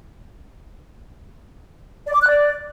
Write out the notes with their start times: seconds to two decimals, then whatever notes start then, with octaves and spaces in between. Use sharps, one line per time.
2.05 D5
2.13 D6
2.21 F#6
2.29 D5